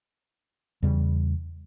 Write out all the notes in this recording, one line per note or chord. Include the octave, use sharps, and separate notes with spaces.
E2 C#3 G3